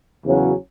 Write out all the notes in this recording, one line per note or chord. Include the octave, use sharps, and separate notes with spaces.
E2 C#3 F#3 C#4 F#4